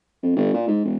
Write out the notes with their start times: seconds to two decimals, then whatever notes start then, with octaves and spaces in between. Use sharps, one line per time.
0.23 F2
0.36 G1
0.54 A#2
0.68 G#2
0.85 E1